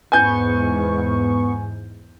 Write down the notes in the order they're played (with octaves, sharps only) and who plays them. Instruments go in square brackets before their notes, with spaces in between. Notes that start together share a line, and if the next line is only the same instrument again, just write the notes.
[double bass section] E2 G#2 [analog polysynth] B3 C#6 [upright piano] G#5 G6